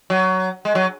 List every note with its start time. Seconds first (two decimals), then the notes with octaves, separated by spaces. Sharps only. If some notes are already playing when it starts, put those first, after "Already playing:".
0.10 F#3
0.65 G#3
0.75 F#3